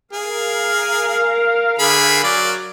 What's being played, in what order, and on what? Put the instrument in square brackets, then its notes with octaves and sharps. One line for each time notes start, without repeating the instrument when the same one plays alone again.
[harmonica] G#4 [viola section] A#4 F5
[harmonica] D3 G#4 B5
F#3 D5